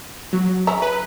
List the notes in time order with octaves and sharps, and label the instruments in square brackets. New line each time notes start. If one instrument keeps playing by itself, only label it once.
[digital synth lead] F#3
[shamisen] C#3 E5 A#5
[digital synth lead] B4